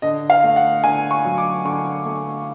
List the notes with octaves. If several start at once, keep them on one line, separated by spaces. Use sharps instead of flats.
D3 D#5
F5
A3
F#5
D3 G#5
C#6
F#3
D6
D3 C#6
A3